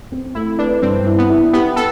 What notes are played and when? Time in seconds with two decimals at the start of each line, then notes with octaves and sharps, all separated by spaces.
0.12 C4
0.35 A3 E4
0.59 D4 B4
0.82 G2 C4
1.06 E4
1.18 B3
1.30 E4
1.53 B3 G4
1.76 A4